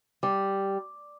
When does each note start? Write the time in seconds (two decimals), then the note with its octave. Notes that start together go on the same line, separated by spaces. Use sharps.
0.23 G3 D6